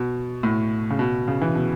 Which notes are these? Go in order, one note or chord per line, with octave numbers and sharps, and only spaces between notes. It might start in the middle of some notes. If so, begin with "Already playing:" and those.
Already playing: B2
A2
C#3
B2
C#3
E3
B2